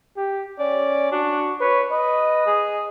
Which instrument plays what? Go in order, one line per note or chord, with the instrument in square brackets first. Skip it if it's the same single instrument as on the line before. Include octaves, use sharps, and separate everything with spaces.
[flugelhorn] G4
[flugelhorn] C#4 [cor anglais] D5
[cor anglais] D4 [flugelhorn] F#4
[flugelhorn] B4 [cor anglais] C#5
[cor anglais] B4 [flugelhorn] D#5
[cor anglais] G#4